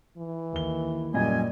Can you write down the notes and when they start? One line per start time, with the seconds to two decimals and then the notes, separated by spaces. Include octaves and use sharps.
0.17 E3
0.53 D#2 G7
1.14 F#2 A#2 G3 D#5 G#5